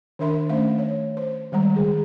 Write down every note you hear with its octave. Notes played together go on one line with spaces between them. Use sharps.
D#3 D4 A#4 E5 B5 C6
A3 C#4 C5 E5 F5
C#5
C5
D#3 G3 G#3 A#5
D3 G#4